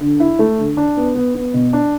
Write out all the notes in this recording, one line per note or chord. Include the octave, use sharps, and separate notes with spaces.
D3
E4
A3
D3
D4
B3
B3
B3
B2
D4